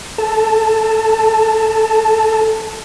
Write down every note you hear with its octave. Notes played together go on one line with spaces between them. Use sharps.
A4 A5